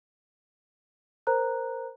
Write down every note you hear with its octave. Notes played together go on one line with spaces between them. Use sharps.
A#4 C5 A#5 F#6